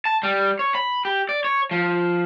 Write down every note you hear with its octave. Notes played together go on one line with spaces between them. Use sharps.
A5
G3
C#5
B5
G4
D5
C#5
F3